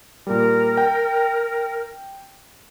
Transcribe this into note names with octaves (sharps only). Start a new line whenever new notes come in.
A#2 G3 A#4
G5